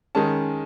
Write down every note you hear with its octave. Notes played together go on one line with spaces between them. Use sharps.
D#3 G#3 C#4 A5